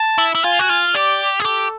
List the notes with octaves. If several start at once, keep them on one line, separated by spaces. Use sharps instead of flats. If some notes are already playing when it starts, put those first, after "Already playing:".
Already playing: A5
E4
E4
F4 G#5
F#4
F4
G4 D5
G#4
G4 A4